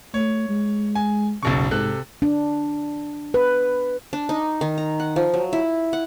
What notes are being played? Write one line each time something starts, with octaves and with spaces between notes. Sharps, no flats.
A3 C#5
G#3
G#5
F#1 B1 C#3 C#6
G#2 C3 A4 F#6
D4
B4
D4
D#4
D#3
A#5
F#5
F3
F#3
E4
F#5